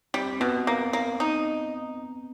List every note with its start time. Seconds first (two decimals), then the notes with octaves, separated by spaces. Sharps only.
0.14 G3 C4
0.40 B2 B3
0.67 A#3
0.93 A#3
1.20 D#4